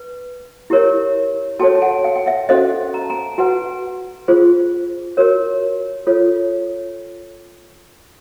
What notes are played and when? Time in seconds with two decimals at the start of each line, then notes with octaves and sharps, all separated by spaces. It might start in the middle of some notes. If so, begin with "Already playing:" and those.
Already playing: B4
0.70 E4 G4 A#4 C#5
1.60 F#4 A4 C#5 G5 A5
1.75 A5
1.82 F#5 G#5
2.04 F5 G5
2.15 G5
2.26 E5 F#5
2.49 C#4 F#4 A4 C5 D#5 F5
2.94 A#5
3.02 A5
3.10 G#5 A#5
3.38 F#4 B4 F#5 G#5
4.28 F4 G#4 C5
5.17 F#4 A#4 C#5
6.07 F4 A4 C#5